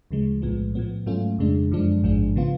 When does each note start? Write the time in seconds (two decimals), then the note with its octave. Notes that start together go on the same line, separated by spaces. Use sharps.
0.11 D2 C#3 F3 G#3
0.42 B1 A2 F3 G#3 B3
0.75 A2 F3 B3
1.06 G#2 F#3 A3 C#4 F4
1.38 F2 C#3 G#3 D4
1.71 F#2 D3 F3 G#3 D4
2.03 A1 G#2 F3 G#3 D4
2.36 C#3 F3 B3 F4